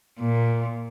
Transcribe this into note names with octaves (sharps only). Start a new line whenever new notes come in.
A#2